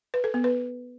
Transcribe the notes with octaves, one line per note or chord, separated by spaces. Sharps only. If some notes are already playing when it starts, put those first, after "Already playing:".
B4
A4
B3
B4